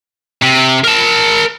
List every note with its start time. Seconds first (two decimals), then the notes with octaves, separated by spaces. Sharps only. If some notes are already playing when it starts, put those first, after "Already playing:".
0.43 C3
0.84 A#4 A5